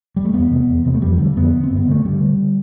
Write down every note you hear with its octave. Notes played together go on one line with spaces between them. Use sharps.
G3
A3
E2 B3
C3
E2
C3 B3
A3
F2 G3
F3
D3
G3
F2 B3
D3
C4
G2
B3
D3 A3
G2 G3
D3